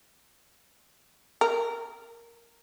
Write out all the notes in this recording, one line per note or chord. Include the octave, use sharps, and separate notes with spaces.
A#4